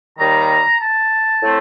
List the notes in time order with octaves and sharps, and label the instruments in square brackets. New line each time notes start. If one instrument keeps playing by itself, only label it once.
[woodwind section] D#2 D#3 G3 A#5
A5
A2 A3 C4